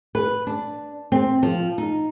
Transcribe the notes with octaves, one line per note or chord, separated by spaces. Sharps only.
B4
D4
C4
F3
D#4